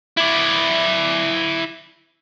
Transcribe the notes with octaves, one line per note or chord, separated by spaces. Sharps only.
E4 D5